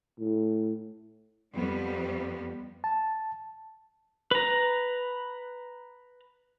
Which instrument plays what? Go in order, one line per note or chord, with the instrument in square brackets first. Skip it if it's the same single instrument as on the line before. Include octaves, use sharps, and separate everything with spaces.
[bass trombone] A2
[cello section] F2 G3 B3
[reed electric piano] A5
[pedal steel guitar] B4 A#5